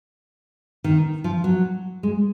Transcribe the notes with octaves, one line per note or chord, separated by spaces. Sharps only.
D#3
F3
F#3
G#3